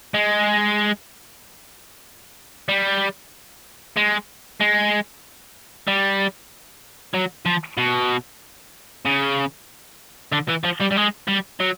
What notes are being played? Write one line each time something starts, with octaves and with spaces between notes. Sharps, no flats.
G#3
G3
G#3
G#3
G3
F#3
F3
B2
C#3
D3
E3
F3
G3
G3
G#3
G3
F#3